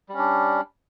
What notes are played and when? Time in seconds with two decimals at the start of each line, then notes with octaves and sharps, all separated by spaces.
0.09 G3
0.14 C#4
0.18 D4